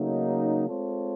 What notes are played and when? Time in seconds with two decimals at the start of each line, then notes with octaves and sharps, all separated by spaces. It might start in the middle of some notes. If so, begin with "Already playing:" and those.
Already playing: C#3 F#3 A3 A#3 D#4
0.68 G#3 C4 F4 A4 C#5